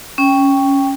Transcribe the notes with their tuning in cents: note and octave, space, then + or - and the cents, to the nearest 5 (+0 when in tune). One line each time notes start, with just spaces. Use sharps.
C#4 +0 G5 +5